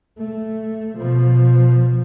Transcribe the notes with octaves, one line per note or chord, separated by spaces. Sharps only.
A3
B2 F3